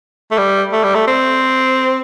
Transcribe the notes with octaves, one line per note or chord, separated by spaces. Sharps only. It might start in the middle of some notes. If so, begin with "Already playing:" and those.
A3
G3
A3
G3
A3
C4